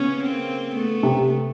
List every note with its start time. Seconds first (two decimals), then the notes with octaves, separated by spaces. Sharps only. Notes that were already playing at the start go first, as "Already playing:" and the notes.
Already playing: C#3 B3 C#4
0.23 A#3 C4
0.75 A3 B3
1.03 C3